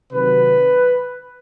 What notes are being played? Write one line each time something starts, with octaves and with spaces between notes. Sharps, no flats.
C3 D#3 F#3 B4